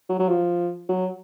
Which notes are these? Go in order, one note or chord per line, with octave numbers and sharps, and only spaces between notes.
F#3
F#3
F3
F#3